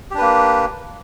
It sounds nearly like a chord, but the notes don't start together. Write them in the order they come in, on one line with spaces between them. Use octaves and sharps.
G4 D4 B4 A#3